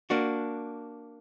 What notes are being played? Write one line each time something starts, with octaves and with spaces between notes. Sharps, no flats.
A#3 D4 F#4